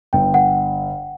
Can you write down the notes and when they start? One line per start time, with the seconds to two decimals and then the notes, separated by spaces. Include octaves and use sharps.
0.13 G1 G5
0.34 F#5